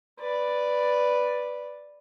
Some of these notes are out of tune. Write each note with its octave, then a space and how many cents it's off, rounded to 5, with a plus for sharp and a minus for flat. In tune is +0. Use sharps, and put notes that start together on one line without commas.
B4 +0 D5 +0